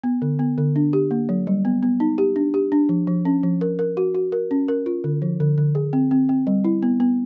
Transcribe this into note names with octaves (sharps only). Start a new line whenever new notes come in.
B3
D3
B3
D3
D4
G4
A#3
F#3
G3
B3
B3
D#4
G4
D4
G4
D4
F3
F3
C#4
F3
A#4
A#4
F#4
F#4
A#4
C#4
A#4
F4
D3
F3
D3
D3
G#4
C4
C4
C4
G3
E4
B3
B3